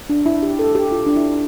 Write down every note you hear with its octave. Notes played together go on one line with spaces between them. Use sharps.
D4
E4
G4
A4
G4
F4
D4
E4